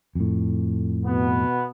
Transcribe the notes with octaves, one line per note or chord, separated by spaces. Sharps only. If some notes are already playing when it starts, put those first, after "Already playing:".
F2 A2
B2 B3